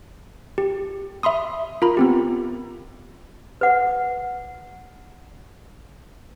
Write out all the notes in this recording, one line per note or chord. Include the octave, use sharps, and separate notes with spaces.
G4
E5 B5 C6 D#6
F4 A#4 A#5 B5
B3 C4 G4
B4 F#5